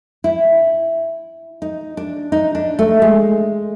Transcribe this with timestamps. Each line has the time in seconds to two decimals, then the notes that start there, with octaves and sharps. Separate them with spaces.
0.24 E4
1.62 D#4
1.97 D4
2.32 D#4
2.55 D4
2.79 A3
3.02 G#3